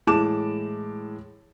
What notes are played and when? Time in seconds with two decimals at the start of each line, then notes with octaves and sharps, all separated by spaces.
0.07 A2 E3 G#3 A5 D6 E7